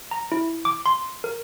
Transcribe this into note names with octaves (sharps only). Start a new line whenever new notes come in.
A#5
E4
D6
C6
A#4